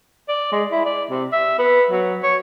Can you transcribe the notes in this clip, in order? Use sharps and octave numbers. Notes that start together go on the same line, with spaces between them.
D5
G#3
E4
D5
C3
E5
B3
F#3
C#5